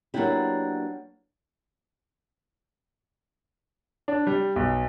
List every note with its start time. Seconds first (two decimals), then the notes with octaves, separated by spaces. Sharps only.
0.14 F#3 A#3 B3 D4 E4 G4
4.08 D4
4.27 G3
4.56 B1